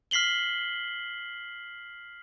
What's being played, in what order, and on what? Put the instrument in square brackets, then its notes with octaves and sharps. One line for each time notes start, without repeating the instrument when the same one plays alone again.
[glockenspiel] F6 B6 C7 F#7 G7